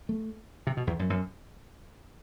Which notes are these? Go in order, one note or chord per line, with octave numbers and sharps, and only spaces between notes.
A3
C3
B2
E2
F#2
F#2